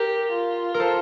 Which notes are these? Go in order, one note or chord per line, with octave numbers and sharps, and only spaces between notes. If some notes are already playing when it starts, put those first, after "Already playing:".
Already playing: G4 A#4
F4
A#4
A4 C5